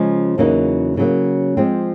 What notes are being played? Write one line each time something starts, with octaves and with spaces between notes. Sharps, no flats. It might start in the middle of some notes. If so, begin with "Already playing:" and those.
Already playing: C#3 F3 G#3
E2 C#3 F#3 A#3 D#4
C#3 F#3 A#3
F3 G#3 C4